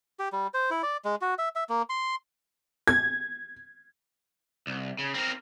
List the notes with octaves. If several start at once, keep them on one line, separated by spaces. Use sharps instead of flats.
G4
G3
C5
E4
D5
G#3
F#4
E5
E5
A#3
C6
G#6
C2
C#3
C4 A#4